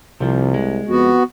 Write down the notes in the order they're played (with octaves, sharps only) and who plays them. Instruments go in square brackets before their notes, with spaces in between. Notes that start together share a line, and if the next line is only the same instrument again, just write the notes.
[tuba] C2 [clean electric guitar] C3 F3
[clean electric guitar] G#3
[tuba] F2 [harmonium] B3 F#4